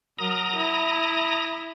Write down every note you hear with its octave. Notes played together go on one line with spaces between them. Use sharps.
F#3 A#4 A#5 D#6
E4